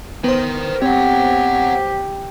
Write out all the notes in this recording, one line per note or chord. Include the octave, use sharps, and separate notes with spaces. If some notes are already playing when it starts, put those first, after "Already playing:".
B3 A#4 C5 G5
C4 G4 C#5 F#5